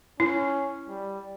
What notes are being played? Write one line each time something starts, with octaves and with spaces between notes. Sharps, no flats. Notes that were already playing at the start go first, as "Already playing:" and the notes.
C#4 E4
G3